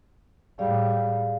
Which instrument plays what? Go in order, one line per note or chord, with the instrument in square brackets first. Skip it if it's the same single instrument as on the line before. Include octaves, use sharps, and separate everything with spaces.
[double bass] A2 G3 [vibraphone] G#4 D5 F5